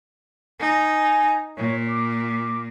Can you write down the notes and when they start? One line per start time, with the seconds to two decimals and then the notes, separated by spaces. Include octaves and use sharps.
0.59 D#4 G#5
1.03 G#5
1.57 A#2 C#5
1.88 D6